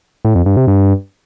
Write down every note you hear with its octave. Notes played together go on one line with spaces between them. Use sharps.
A2
F2
G2
C3
G2